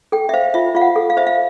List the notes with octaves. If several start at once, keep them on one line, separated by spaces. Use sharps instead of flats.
A4 G5
E5
C5 F5
F4 E5
F4 F5
F#5
A4
F5
C5 E5
F5